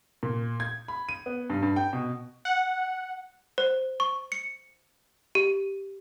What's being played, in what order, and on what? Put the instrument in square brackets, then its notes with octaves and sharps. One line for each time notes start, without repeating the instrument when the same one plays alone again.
[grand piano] A#2
G#6
B5
D#7
B3
G2
G2
G5
B2
[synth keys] F#5
[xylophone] C5
C#6
C#7
G4